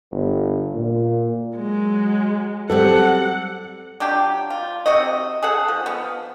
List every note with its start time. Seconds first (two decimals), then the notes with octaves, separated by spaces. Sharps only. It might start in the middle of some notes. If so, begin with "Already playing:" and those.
0.11 G1
0.74 A#2
1.56 F#3 G#3
2.70 F#3 G3 C4 A4 F#5
4.00 F#3 D4 F4 G4
4.50 F4
4.86 C3 F#4 D#5
5.43 G#4 A4 F#5
5.68 F3
5.86 F3 B3